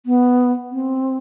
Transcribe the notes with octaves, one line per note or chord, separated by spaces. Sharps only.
B3
C4